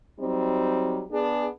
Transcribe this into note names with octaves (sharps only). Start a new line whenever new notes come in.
F#3 G3 C4 D#4
B3 D4 G#4